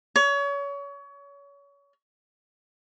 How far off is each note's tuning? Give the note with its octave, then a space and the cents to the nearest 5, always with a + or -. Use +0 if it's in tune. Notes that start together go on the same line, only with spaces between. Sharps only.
C#5 +30